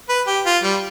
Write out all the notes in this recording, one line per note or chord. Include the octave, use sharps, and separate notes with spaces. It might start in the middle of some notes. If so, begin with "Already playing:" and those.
B4
G4
F4
G3